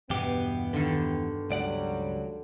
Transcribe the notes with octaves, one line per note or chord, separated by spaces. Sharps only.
E2 G2 B2 B3 G4
D3 D#3
C#2 F#3 G3 D5 F#5